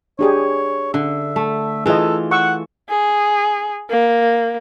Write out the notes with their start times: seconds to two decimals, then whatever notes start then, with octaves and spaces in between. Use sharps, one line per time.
0.19 D4 G4 G#4 C#5
0.94 D3 E5
1.36 A3
1.86 E3 F4 G#4 A4 D#5
2.31 F#5 C#6 E6
2.89 G#4
3.90 A#3